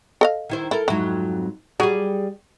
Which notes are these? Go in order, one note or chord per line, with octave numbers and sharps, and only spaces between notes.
A4 D#5 F5
D#3 E4 C5
E4 A4 A#4
F2 G#2 F#3 E4
F#3 G3 G#4